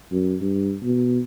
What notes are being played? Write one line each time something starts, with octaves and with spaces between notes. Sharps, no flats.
F#2
G2
B2